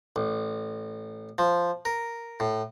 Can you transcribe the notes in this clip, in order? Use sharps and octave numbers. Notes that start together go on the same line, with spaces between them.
A1
F3
A#4
A2